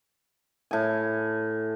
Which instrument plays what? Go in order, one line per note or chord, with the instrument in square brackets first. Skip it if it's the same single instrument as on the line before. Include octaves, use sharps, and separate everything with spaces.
[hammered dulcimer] A2 G#5